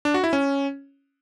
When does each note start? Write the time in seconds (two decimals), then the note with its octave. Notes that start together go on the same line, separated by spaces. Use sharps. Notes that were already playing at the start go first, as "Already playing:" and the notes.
0.05 D4
0.14 F#4
0.24 E4
0.33 C#4